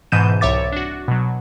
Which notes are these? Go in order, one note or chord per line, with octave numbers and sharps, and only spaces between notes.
G#2 B2 E3 G6 D#7 E7
C2 C#5 E5 D6 A6
D4 F#4
B2 F#3